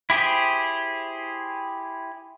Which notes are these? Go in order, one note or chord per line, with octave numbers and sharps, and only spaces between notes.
E4 G4 G#4 C5